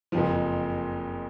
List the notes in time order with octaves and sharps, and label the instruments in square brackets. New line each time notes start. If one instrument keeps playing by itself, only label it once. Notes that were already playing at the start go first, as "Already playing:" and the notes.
[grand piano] F#1 F2 F3